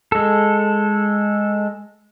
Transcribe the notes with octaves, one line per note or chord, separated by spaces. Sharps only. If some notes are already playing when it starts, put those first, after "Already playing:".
G#3 A4